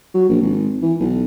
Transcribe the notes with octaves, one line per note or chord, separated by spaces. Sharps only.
F#3
A#1
G#1
E3
B1